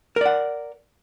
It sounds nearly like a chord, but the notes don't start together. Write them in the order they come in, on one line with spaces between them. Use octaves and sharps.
A#4 D5 F#5